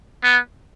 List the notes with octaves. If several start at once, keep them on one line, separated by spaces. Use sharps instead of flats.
B3